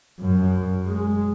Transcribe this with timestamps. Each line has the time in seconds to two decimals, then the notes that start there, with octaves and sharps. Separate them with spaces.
0.20 F#2
0.86 G#3